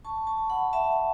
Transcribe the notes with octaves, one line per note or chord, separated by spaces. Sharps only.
A5 C#6
A5 C#6
F#5 B5
E5 A5